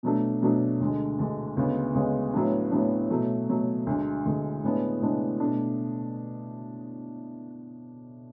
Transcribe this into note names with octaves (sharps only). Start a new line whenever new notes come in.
B2 F#3 A3 D4
B2 F#3 A3 D4
D2 D3 G#3
D2 D3 G#3
D2 C#3 G#3 B3
D2 C#3 G#3 B3
A2 F#3 B3 D4
A2 F#3 B3 D4
B2 F#3 A3
B2 F#3 A3
D2 D3 G#3
D2 D3 G#3
A2 G#3 B3 D4
A2 G#3 B3 D4
B2 A3 D4